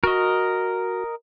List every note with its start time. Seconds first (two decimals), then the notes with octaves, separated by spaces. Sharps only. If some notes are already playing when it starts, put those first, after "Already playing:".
0.04 F#4 A#4 D#5